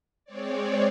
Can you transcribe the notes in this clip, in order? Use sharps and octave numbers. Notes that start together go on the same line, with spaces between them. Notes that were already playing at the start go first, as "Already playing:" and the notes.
G#3 C4 C#5 D5